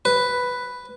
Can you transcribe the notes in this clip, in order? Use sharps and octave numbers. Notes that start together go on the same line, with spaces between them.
B4